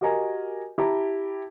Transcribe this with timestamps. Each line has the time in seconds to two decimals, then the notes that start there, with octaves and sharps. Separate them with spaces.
0.01 F#4 G4 A#4 D#5 G#5 A#5
0.78 E4 G4 A5 A#5